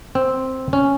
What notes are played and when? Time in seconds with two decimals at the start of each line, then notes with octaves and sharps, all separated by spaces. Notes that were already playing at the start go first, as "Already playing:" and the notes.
0.15 C4
0.73 C#4